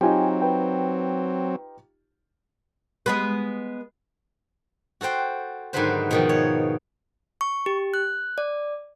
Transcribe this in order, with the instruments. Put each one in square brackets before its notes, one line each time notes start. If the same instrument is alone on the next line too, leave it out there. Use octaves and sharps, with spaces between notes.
[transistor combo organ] F#3 C4 [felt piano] D#4 F4 G4 [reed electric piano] G5 G#5
[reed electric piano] B4 G5
[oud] G#3 B3 B4
[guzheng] F#4 A4 C5 G5
G#2 D3 D#3 F#3 B4 C5
B2 D#3 F3
C#5
[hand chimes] C#6
G4
F#6
D5